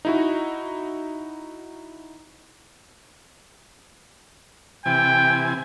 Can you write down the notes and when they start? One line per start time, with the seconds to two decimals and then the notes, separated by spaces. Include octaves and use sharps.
0.05 D#4 E4 F#4
4.86 C3 E3 G5 G#5